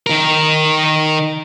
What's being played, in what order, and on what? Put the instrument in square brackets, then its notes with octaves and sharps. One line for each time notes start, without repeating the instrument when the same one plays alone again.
[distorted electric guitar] D#3 A#4